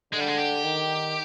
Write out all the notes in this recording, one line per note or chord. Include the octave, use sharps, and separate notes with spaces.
D3 G#3
G3
G#3
G4
D#3